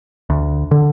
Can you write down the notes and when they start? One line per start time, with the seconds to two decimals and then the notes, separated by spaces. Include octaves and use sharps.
0.30 D2
0.71 D3